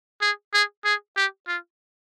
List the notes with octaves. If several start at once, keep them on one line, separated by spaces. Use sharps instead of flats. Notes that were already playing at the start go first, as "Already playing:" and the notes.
G#4
G#4
G#4
G4
F4